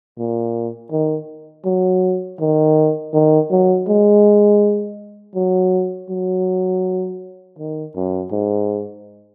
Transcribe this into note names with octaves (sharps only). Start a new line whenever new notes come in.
A#2
D#3
F#3
D#3
D#3
F#3
G#3
F#3
F#3
D#3
F#2
G#2